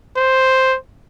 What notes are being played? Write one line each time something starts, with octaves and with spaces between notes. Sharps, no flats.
C5